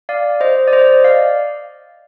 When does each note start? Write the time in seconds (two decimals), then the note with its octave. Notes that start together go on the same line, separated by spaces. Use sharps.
0.09 D5 F5
0.41 C5 D#5
0.68 D5
0.73 C5 D#5
1.04 D5 F5